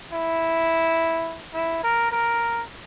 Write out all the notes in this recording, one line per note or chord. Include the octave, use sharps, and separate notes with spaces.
E4
E4
A#4
A#4